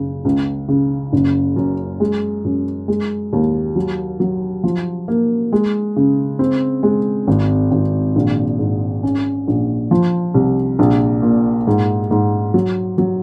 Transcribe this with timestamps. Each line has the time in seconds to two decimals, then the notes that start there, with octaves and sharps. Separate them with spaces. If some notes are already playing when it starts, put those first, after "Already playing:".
Already playing: F#1 C#3
0.25 C#2
0.68 C#3
1.13 F#1
1.56 F#2
2.00 G#3
2.45 F#2
2.88 G#3
3.33 D#2
3.76 F#3
4.20 F#3
4.63 F3
5.08 A#3
5.52 G#3
5.96 C#3
6.39 C4
6.83 G#3
7.28 G#1
7.71 G#1
8.16 A#1
8.59 G#2
9.03 C#4
9.48 A#1
9.91 F3
10.34 C2
10.79 A#1
11.22 A#2
11.67 G#2
12.11 G#2
12.54 F#3
12.98 F#3